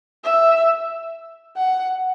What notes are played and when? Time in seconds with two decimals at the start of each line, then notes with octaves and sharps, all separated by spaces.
0.24 E5
1.57 F#5